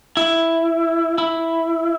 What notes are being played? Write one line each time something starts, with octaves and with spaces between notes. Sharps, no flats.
E4
E4